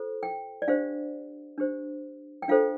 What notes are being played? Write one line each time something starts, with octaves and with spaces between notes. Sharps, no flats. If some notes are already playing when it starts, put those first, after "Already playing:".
Already playing: F4 A4 C5
G5
D5
D4 G4 C5 F5
D4 G4 C5
G5
D4 F4 A4 C5 F5